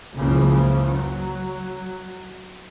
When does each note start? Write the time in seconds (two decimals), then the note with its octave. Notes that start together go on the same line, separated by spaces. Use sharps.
0.15 F#1 C#2 C#3 E3 F3
0.82 F#3